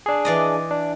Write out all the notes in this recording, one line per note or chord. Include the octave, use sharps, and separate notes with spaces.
D4 G#4
E3 D5 D#5
D4